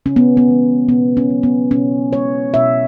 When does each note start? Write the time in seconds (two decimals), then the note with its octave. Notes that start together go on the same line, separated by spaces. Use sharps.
0.06 C#3 C#4
0.16 B3
0.37 B3
0.48 E3 G#3
0.88 B2 B3
1.17 C#4
1.30 F#3
1.43 B3
1.71 B2 C#4
2.13 G#3 C#5
2.54 B2 E5